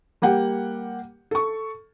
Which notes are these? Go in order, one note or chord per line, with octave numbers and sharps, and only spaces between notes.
G3 A#3 G4 F#5 G5
A4 C#6